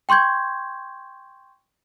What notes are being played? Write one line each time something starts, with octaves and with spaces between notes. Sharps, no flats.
G5 C6 C#6 G6 G#6